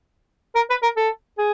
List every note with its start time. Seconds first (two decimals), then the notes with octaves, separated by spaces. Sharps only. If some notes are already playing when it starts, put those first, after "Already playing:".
0.55 A#4
0.70 B4
0.83 A#4
0.97 A4
1.38 G#4